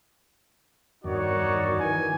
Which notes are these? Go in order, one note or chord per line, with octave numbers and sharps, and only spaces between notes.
E2 G2 D#3 D#4 F#4 C#5 D5
D#3 E3 G#5